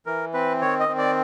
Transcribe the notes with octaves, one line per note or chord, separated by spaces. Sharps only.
E3 A#4
C4 B4
D#3 C#5
D#5
C4
D5